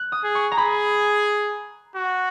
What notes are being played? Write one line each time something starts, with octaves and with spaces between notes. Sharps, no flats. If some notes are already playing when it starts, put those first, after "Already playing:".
Already playing: F#6
D#6
G#4
C#6
A#5
G#4 B5
F#4